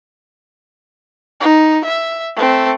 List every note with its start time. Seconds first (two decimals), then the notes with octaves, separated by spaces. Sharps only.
1.41 D#4
1.84 E5
2.36 A3 C4